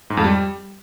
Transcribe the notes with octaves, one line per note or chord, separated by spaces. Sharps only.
G#2
F2
G3